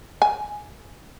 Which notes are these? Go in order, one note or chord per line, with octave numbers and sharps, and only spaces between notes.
G#5